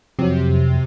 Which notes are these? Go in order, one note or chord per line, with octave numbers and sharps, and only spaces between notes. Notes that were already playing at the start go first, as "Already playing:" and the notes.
F2 C3 F#3